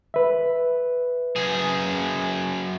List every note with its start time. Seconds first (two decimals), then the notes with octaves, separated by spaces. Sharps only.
0.14 B4 E5
1.36 F#2 G#4